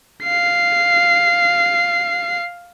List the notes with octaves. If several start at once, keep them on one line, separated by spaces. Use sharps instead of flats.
F5 C7